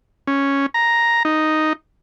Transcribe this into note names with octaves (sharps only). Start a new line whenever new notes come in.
C#4
A#5
D#4